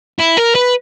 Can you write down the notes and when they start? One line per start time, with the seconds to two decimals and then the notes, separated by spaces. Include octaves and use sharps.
0.19 E4
0.37 A#4
0.55 B4